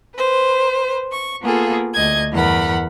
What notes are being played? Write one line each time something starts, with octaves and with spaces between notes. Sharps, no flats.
B4 C5
C#6
A#3 B3 F4 G#4 A4
D2 D#5 G#6
E2 G2 A#4 F#5 B5